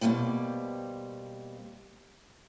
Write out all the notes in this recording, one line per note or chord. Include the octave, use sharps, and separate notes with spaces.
B2 E3 G3 A#3 C4